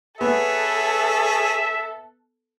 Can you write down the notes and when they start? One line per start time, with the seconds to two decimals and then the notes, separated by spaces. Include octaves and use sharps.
0.21 B3 G#4 A4 C#5 E5